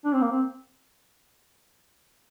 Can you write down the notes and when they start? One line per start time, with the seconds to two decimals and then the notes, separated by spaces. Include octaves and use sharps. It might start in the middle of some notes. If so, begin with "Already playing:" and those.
0.05 D4
0.13 C4
0.22 A#3
0.31 C4